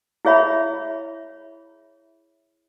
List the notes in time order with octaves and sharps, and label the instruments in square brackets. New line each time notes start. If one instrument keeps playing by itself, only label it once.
[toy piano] E4 G#4 C#5 E5 B5